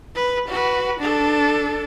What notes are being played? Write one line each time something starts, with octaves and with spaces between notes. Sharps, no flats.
B4
F#4 B4
D4 A4